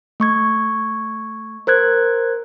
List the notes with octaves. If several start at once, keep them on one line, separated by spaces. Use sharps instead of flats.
A3 C#6 G#6
A#4 C5 F#6 G#6